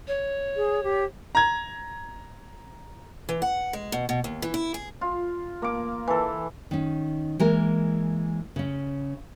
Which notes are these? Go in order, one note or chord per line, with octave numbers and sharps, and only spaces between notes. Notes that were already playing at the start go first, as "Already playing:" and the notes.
C#5
G#4
G4
A#5 G#6
E3
F#5
G#3
B2
B2
D#2
E3
E4
G#4
F4
A#3 D6
E3 A4
D#3 C#4
E3 G#3 A#3 A#4
C#3 C#4